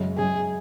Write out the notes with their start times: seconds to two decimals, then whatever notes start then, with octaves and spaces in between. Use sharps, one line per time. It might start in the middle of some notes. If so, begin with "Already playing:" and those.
Already playing: F#2 C#3 G#3
0.17 F#2 C#3 G#3 G#4